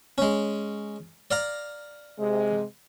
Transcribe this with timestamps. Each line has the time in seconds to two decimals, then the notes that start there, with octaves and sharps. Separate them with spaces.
0.18 G#3 C#4
1.31 D5 F5 A#5
2.19 C3 G#3